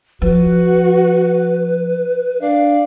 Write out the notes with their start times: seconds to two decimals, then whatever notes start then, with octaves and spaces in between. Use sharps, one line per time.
0.22 F3 F#4 B4
2.42 D4 F5